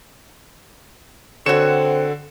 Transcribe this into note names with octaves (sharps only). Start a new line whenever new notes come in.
D3 C4 F#4 A4 C#5 C#7 E7